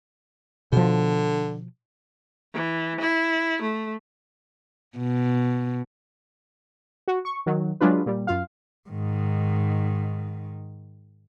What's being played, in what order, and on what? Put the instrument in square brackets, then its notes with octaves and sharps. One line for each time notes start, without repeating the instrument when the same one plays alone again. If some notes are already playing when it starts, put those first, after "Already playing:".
[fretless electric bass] B2 F3 [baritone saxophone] D3
[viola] E3
E4
A3
[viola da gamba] B2
[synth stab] F#4
C#6
D#3 F#3
F#3 G#3 D4 F4 B4
A#2 G3
F#2 F4 F5
[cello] G#2 D#3